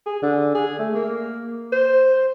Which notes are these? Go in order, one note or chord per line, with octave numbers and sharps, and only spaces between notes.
G#4
D3
G#4
A3
A#3
C5